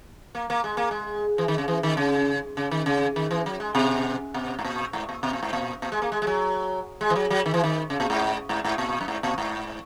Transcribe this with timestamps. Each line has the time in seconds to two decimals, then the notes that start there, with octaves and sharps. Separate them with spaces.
0.35 A#3
0.50 A#3
0.64 G#3
0.77 A#3
0.91 G#3
1.38 E3
1.48 D#3
1.58 C#3
1.68 E3
1.83 D#3
1.97 C#3
2.57 C#3
2.71 D#3
2.86 C#3
3.16 D#3
3.31 E3
3.46 F#3
3.60 G#3
3.75 B2
4.34 B2
4.59 G#2
4.64 A#2
4.93 G#2
5.09 A#2
5.23 B2
5.33 A#2
5.43 G#2
5.53 A#2
5.82 A#2
5.92 G#3
6.02 A#3
6.12 G#3
6.22 G#3
6.27 F#3
7.01 G#3
7.10 E3
7.16 F#3
7.30 F#3
7.46 D#3
7.54 E3
7.64 D#3
7.90 C#3
8.00 A#2
8.10 G#2
8.49 G#2
8.64 G#2
8.78 A#2
9.01 F#2
9.08 G#2
9.23 A#2
9.38 G#2